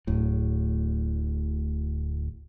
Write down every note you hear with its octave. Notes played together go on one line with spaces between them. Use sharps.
D1 A2